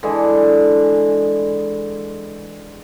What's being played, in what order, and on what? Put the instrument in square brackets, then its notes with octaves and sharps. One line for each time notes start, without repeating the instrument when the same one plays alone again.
[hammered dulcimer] D3 E3 G#3